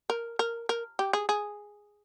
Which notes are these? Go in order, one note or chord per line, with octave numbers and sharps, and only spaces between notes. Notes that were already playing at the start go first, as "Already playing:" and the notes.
A#4
A#4
A#4
G4
G#4
G#4